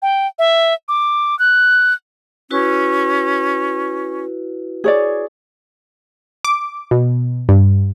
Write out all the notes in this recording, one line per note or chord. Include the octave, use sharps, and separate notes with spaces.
G5
E5
D6
F#6
C#4 E4 F#4 B4
G#4 C#5 D5
D6
B2
G2